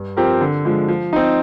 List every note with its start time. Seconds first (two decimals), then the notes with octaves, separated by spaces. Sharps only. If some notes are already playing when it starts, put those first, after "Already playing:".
Already playing: G2
0.17 F3 C4 G4 A#4
0.41 D3
0.65 F3 G#3
0.88 F3
1.13 C4 D#4